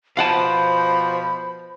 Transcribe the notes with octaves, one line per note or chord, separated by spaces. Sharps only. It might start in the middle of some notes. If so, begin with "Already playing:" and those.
B2 F3 C5 F5 F#5 A5 B5